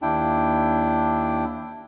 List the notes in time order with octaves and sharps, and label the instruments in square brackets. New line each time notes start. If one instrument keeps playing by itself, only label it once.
[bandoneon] D#2 D4 E4 G5